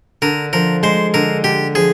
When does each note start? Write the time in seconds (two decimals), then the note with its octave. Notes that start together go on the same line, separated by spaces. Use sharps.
0.22 D3 A#4
0.53 F3 A#4
0.83 G#3 C5
1.14 D3 A#4
1.44 D3 G4
1.75 F3 G#4